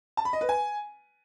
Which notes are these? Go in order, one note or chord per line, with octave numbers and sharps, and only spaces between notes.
A5
B5
D#5
B4
G#5